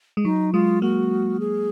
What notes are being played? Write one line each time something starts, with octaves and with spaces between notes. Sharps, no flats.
G#3
F#3 D#4
G#3 F4
A#3 F#4
G#4